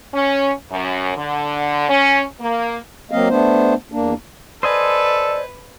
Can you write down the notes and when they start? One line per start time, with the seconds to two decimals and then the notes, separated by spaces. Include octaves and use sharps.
0.14 C#4
0.72 F#2
1.17 D3
1.89 C#4
2.41 A#3
3.11 F#3 A#3 C4 D#5 F5
3.29 A3 B3 D4 C5
3.92 E2 A#3 D4
4.63 A4 B4 C5 D5 D#5 G#5